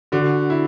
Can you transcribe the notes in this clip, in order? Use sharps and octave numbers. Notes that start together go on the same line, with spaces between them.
D3 F#4
E4